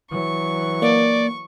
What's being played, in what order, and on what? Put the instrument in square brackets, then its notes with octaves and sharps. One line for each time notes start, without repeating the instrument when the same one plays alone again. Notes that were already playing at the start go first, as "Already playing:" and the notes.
[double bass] E3 F#3 [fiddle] C#6
[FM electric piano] A#3 [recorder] D5